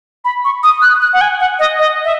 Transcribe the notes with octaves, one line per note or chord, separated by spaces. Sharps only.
B5
C#6
D#6
F#6
F#6
F#5
G#5
F#5
D#5
D#5
E5